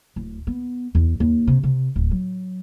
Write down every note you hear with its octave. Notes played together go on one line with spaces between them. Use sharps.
D1
B3
E2
D#2
C3
C3
D1
F#3